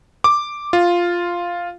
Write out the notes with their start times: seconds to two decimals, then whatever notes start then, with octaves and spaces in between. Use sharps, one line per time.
0.24 D6
0.73 F4